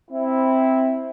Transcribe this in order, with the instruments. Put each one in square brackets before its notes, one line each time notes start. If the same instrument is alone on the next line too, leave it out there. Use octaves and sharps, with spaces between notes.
[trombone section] C4 E4